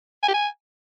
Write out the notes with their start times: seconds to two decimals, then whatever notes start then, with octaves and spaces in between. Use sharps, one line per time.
0.23 G#5
0.28 G4
0.34 G#5